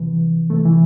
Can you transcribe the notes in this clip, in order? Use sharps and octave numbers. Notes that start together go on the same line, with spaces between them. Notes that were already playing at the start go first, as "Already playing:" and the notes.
Already playing: C2 C3 E3
C2 C3 E3 A3
E3